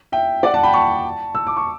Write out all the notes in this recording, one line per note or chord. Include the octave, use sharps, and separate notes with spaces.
E5 G5
D5 F#5
F#5 A5
G5 B5
A5 C#6
E6
D6
C#6